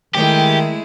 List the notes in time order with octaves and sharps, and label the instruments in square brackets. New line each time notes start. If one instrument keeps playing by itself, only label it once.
[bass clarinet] D#3 [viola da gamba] G#3 A3 E4 [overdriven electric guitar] G4